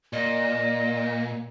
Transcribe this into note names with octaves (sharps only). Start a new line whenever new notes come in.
A#2 D#5